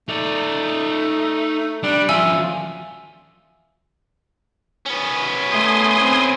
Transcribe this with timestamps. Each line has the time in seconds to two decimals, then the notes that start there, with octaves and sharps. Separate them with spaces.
0.08 A3 D#4 D5
1.83 G3 D4
2.09 F3 C#4 F4 E5 G#5 E6
4.86 B3 C#4
5.52 A3 G#5 C6 D#6
6.00 C4